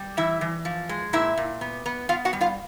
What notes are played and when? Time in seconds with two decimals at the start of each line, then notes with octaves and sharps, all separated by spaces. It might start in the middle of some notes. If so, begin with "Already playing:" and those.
Already playing: G3
0.17 E3 E4 E5
0.41 E3
0.65 F3
0.89 G#3
1.13 A#2 E4 E5
1.37 A#2
1.61 B3
1.86 B3
2.09 B3 F4 F5
2.25 F#4 F#5
2.33 G3
2.41 F4 F5